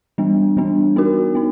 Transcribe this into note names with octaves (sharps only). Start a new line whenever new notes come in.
E3 G3 B3 D4
E3 G3 B3 D4
B3 D#4 F#4 A#4
B3 D#4